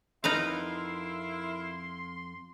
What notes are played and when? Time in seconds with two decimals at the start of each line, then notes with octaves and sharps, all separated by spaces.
0.24 F2 D#4 E4 A#4 B4 E5 F5 C6